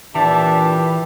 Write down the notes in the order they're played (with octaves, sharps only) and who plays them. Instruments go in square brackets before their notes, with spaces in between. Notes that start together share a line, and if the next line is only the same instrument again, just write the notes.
[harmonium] A#2 D4 E5 [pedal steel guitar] E3 [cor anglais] G4 [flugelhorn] A5